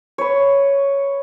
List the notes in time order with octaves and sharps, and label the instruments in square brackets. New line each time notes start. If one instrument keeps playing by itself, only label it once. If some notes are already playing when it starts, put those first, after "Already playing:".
[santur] B4 C#5